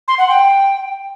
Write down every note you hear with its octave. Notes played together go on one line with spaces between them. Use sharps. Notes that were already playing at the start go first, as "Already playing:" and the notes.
C6
F#5
G5